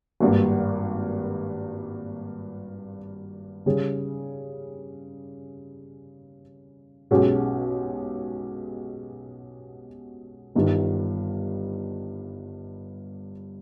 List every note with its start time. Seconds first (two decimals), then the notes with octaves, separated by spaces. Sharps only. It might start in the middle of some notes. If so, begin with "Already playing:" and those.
0.20 G#1 G2 G3 A#3
3.66 C#3 G3 C#4 G#4
7.11 B1 B2 G#3 C#4 G4
10.55 G1 G2 D#3 G3